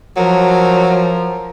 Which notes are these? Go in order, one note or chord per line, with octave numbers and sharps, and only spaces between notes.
F3 F#3 A#4